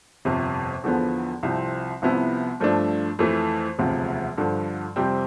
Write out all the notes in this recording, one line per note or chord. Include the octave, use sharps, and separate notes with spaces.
G1 F2 C3
E2 D3 F3 B3
C2 C3 F3 C4
C2 C3 F3 B3 E4
G2 F3 A3 D4
F2 E3 A3
E1 D2 C3 F3
G2 D3 F3
F2 C3 G3 C4